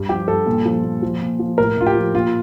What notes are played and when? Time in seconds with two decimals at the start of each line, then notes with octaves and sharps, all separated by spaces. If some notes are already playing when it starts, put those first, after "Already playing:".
Already playing: G2
0.09 F3 G4
0.28 G2 A4
0.46 A#2
0.65 F3
0.84 A#2
1.02 F3
1.21 A#2
1.39 F3
1.58 A2 A#4
1.77 A2 F4
1.86 G4
1.95 F3
2.14 A#2 F4